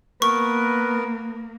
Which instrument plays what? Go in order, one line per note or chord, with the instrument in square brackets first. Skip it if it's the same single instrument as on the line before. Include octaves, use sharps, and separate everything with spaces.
[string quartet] A#3 [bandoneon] B3 A#4 [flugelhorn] B4 [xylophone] C#6